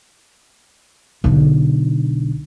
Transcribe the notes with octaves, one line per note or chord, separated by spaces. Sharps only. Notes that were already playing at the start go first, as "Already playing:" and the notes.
B1 D3